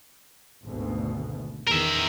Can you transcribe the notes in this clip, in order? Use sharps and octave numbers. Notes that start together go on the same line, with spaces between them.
G#1 D2 B2
E2 D#3 A#4 E5